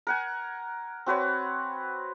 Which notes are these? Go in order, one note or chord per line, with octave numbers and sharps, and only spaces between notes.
A#4 F#5 G#5
C4 F#4 B4 C#5